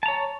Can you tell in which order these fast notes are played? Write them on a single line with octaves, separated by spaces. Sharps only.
A5 A#5 C#5